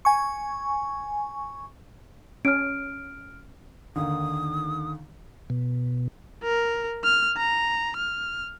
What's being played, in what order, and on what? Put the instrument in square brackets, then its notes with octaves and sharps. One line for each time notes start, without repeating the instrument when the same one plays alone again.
[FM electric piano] G#5 C#6
[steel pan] C#4 [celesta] F6 D7
[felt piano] D#2 D3 D#3 [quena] D#6
[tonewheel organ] B2
[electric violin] A#4
F6
A#5
F6